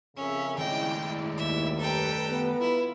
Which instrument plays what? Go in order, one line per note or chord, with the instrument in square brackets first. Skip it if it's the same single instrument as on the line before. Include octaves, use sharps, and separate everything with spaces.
[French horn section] F2 C#3 [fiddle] C#4 [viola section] A#4 E5
[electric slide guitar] D#3 A3 D#5 [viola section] G#3 E4 D5 [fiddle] G5
[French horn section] D#2 [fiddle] E5
[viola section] G3 B4 A#5 [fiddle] A4 G5
[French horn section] B3
[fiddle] E4 [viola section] F4